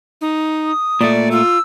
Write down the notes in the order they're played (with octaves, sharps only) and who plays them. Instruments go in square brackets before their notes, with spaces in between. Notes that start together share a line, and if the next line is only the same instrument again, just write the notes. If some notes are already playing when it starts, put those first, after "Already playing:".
[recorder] D#4
[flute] D#6
[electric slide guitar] A#2 A3 [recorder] D5
[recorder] F4 [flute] E6